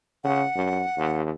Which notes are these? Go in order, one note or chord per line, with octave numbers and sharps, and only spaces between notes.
C#3 F#5
F#2
D#2